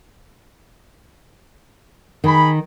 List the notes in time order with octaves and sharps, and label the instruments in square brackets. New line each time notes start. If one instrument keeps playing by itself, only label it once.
[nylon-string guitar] D#3 [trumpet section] G#4 B5